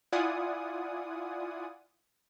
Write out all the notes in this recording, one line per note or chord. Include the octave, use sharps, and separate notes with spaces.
E4 F4 D5 F#5 G#5 D#6